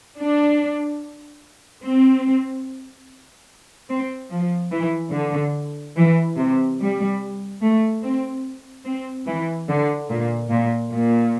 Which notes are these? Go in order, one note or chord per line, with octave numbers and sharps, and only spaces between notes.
D4
C4
C4
F3
E3
D3
E3
C3
G3
A3
C4
C4
E3
D3
A#2
A#2
A#2